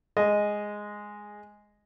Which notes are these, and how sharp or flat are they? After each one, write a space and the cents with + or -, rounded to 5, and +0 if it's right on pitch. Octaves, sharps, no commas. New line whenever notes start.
G#3 +0 D#5 +0